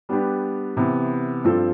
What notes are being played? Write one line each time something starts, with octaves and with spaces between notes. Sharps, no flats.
G3 B3 D4 G4 B4
C3 E3 B3
G2 F3 C4 F4 A4